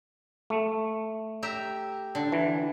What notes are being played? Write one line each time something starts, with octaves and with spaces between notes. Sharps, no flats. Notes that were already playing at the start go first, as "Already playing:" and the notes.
A3
G4 E5 A#5
D3
E3